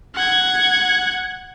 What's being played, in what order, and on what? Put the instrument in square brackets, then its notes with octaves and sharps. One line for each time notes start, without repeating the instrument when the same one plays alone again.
[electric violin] F#5 G#6